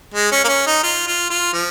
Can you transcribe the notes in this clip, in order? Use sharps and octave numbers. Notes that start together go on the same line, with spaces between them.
G#3
C#4
A#3
C#4
D#4
F4
F4
F4
F3